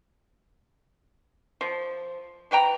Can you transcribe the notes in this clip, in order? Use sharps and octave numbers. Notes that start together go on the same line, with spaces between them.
F3
E3 B4 G5 A#5